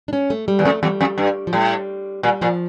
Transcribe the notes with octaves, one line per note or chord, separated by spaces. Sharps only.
D4
C#4
A3
G3
E2
F2 A3
E2 G3
F2
G2
F3
A2 G3
A#2 G3
A#2 F3